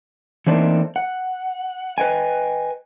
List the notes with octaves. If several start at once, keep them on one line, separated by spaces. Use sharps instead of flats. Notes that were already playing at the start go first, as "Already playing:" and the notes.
E3 A3 A#3 C4 D4 D#4
F#5
B4 D#5 G5 G#5